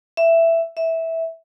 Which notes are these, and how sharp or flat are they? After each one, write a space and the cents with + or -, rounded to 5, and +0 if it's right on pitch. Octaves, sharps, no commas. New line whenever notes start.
E5 +10
E5 -10